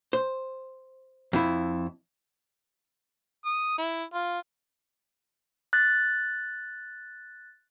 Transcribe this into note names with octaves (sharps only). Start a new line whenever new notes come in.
C5
F2 E4
D#6
E4
F4
F#6 A6